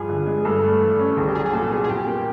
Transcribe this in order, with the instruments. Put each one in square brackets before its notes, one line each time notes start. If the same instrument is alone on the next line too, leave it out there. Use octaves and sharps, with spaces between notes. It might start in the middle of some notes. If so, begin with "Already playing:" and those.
Already playing: [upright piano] G2 F3 [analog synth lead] G#4
[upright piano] D3
G#3
[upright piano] G2 [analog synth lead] A4
[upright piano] A3
E3
C#4
[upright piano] C2 [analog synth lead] G#4
[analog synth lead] G4
[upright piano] F#3 [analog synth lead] G#4
[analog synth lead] G#4
[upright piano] A#2 [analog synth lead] A4
[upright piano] B3 [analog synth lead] G#4
[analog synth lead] G#4
[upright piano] A#2 [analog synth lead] G4
[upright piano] A#3